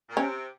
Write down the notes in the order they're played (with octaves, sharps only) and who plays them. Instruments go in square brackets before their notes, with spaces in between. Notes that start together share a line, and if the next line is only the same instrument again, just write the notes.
[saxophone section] A#2
[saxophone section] C3 [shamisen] C#4